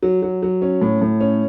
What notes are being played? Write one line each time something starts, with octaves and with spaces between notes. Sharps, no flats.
F#3
F#3
F#3
C#4
A2
A2
C#4